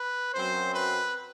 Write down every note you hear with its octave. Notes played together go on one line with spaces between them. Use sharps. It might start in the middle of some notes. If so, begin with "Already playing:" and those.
Already playing: B4
F#2 F#3 C4 C5
B4